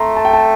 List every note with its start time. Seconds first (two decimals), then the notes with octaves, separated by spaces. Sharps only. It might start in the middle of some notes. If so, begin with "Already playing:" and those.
Already playing: A3 A#5 C6
0.16 A5
0.25 G5
0.34 A5